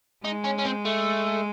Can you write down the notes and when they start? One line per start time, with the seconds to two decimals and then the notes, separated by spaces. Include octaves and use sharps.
0.24 G#3 D#4
0.44 C#4
0.59 C#4
0.65 C4
0.85 A3